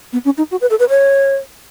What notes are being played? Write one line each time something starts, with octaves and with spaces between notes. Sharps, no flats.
B3
C#4
D#4
F#4
B4
A4
B4
C#5